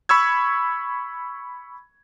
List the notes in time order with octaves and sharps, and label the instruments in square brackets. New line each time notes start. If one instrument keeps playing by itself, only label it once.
[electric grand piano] B5 C#6 E6 G#6